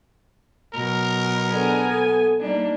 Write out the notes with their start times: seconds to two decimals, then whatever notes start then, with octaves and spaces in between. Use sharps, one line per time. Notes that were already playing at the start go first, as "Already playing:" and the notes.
0.74 B2 F#3 A#4
1.49 B3 D4 G#4 A4 G#5
1.90 A4
2.41 G3 A#3 D4 D#4 D5